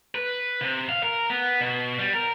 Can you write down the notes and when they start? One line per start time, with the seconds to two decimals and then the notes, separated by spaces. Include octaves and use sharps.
0.15 B4
0.61 C3
0.89 F5
1.03 A#4
1.30 B3
1.61 B2
1.99 G3
2.14 A#4